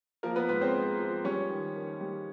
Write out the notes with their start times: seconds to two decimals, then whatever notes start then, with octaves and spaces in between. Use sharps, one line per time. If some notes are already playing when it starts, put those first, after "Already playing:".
0.23 F3 A#3 A#4
0.36 B3 B4
0.49 G#2 B3 B4
0.61 C4 C5
0.74 G#3
0.99 F3
1.25 G3 C#4 C#5
1.50 D#3
1.75 D#3
2.01 G3